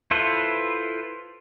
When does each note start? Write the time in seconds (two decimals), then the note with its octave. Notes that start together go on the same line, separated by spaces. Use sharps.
0.11 E4 F4 A4 B4 C5